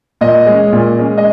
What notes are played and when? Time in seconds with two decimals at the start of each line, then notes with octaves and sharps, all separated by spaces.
0.21 A#2 D#5
0.46 G#3 C#4
0.72 A#2
0.99 G#3 C#4
1.18 D#5